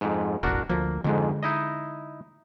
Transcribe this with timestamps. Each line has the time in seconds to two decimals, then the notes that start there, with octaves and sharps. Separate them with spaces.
0.01 F2 G#2
0.43 E1 A1 D4 F#4 A#4
0.69 D2 F3 A#3
1.04 F2 G#2 D3 G#3
1.43 D#4 E4 D#5